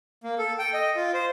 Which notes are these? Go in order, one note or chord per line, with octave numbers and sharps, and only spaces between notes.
A#3
A4
G5
D#5
F4
C5